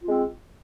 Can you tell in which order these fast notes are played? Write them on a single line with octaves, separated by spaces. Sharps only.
F4 G#3 C4